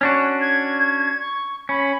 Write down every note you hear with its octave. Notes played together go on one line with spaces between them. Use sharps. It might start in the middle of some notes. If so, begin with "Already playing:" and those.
C#4 D4 F#4
G#6
C#6
C#4 B5